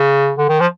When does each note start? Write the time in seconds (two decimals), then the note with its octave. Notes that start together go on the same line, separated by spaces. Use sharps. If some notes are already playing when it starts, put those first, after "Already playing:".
Already playing: C#3
0.38 D3
0.49 D#3
0.60 F3